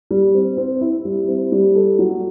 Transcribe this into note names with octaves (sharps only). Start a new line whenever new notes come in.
G3
C4
C4
E4
G3
C4
G3
A4
F#3